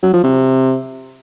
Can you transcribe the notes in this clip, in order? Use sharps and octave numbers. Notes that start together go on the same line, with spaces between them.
F#3
F3
C3